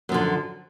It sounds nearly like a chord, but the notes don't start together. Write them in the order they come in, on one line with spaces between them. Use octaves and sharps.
F#2 F3 D3